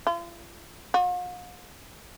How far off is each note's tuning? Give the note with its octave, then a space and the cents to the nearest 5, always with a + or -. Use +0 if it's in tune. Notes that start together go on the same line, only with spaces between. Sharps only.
F4 -40
F4 +45